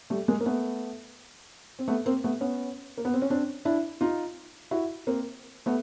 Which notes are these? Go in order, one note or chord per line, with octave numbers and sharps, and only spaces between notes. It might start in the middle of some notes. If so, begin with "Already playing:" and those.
G3 A3
G#3 A#3
A#3
A3 B3
C4
A3 B3
A#3 C4
A3 B3
B3 C#4
A#3
B3
C4
C#4
C4 D4
D4 E4
D#4 F4
E4 F#4
A#3 C4
A3 B3